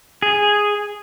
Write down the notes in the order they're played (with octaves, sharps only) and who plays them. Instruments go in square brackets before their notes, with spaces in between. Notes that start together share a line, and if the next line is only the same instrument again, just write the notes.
[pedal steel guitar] G#4